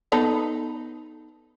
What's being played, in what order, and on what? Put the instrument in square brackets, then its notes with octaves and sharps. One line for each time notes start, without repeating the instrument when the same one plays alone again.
[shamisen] B3 D#4 A4